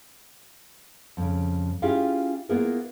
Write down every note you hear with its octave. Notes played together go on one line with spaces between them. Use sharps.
F2 C#3
C#4 E4 F4 G4 G#4 F5
A#3 B3 E4 F4 G#4 A#4